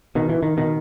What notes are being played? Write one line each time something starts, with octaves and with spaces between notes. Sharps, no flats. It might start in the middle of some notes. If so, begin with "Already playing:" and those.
B2 D#3
E3
D#3
B2 D#3